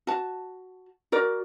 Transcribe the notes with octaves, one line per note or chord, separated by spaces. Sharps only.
F#4 A5
F#4 A#4 D5